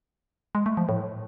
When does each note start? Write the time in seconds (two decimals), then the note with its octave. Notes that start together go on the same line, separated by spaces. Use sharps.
0.55 G#3
0.66 A3
0.77 F3
0.89 A2